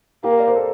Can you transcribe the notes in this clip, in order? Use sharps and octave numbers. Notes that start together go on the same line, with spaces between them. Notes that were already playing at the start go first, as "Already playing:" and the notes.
A#3 G4
A#4
D5
C5
A4